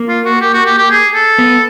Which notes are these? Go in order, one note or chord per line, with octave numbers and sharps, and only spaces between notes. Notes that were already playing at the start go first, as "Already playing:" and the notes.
Already playing: A#3
F4
F#4
G4
F#4
G4
G4
G#4
A4
B3